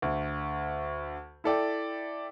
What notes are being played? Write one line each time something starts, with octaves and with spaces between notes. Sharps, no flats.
D2
E4 A4 D5 G5